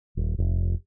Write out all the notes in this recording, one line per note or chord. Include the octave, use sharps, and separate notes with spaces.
D#1
F1